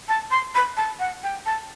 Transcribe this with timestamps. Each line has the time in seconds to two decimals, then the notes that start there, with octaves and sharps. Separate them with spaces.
0.08 A5
0.31 C6
0.55 B5
0.77 A5
0.99 F#5
1.23 G5
1.46 A5